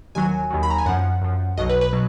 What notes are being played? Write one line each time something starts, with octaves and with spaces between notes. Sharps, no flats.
D#2 D#3 F#3 G#5
D#2 D#3 F#3
B5
A#5
G#5
F#2 F3 F#5
F#2 F3
B1 B2 F#3 D#5
B4
B4
B2 F#3